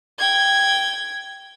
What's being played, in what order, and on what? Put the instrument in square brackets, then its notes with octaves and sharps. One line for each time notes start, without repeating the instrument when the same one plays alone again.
[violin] G5 G#6